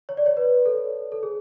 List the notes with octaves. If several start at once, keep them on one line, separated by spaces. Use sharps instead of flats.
C#5
D5
C#5
B4
A4
A4
G#4